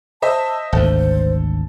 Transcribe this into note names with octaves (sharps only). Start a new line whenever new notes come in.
C5 D#5 E5 A5
G#1 D2 A4 C5